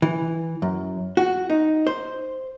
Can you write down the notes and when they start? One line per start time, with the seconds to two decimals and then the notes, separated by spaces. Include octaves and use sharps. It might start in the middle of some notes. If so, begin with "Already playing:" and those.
0.02 E3
0.62 F#2
1.17 F#4
1.50 D#4
1.87 C5